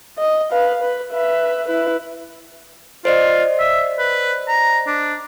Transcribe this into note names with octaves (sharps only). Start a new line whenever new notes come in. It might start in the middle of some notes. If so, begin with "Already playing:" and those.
D#5
B4 F5
B4
B4 E5
E4 B4
F4 C5 D5 D#5
E5
B4
A#5
D4